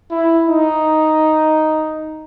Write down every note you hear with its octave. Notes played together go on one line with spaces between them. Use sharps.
E4
D#4